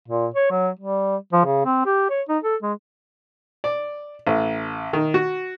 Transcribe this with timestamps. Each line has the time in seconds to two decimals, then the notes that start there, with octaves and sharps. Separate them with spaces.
0.08 A#2
0.34 C#5
0.51 F#3
0.80 G3
1.33 F3
1.46 C#3
1.65 C4
1.86 G4
2.10 C#5
2.29 D#4
2.43 A4
2.63 G#3
3.64 D5
4.27 A1
4.93 D#3
5.14 F#4